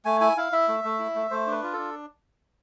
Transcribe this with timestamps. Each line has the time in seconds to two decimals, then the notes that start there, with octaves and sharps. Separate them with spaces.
0.05 A3 G#5
0.21 E4 G#5
0.37 E4 F5
0.53 E4 E5
0.68 A3
0.84 A3
0.99 E4
1.15 A3
1.31 A3 C5
1.47 D4
1.52 B4
1.63 F4
1.73 D4 A4